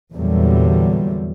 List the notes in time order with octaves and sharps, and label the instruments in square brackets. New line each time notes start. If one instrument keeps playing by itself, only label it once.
[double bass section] E2 A#2 D3 F#3 G3